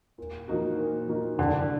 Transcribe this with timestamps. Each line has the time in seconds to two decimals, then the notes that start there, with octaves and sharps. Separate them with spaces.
0.18 A#2
0.48 F3 A#3 D#4 F#4
0.78 A#2
1.08 F3 A#3 D#4 F#4
1.39 C2 D3